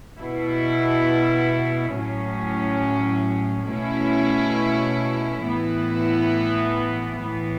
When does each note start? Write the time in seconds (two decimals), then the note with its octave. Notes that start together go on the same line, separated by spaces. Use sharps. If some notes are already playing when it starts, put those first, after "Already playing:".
0.19 B2 B3 E4
1.94 A2 F#3 C#4
3.69 B2 A3 C#4 E4
5.45 A2 E3 B3 E4
7.19 A2 E3 B3